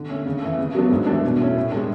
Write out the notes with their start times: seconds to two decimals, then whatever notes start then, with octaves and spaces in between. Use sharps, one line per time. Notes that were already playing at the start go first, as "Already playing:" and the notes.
Already playing: D3
0.09 A3 C#4
0.26 C#3
0.42 E3 A3
0.59 C#3
0.75 F#3 B3 D4
0.91 G#2
1.07 E3 A3 D4
1.23 B2
1.40 A3 C#4 E4
1.57 A2
1.72 G#3 D4